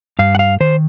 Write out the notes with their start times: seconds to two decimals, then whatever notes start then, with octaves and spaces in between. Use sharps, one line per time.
0.19 G2 F5
0.35 F#5
0.39 F5
0.60 D#3 C5